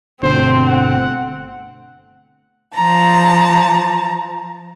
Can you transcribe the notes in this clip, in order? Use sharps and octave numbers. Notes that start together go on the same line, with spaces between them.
G1 B2 D3 A3 C4 C5
F#5
F3 A5 A#5